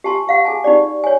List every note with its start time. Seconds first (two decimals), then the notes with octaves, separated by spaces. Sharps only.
0.04 G4 G#5 A5 C6
0.27 G4 F5 F#5
0.45 G#4 G#5 A5
0.64 D#4 G4 D5
1.04 C#5 G#5